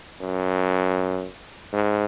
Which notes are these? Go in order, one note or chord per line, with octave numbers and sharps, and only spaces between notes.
F#2
G#2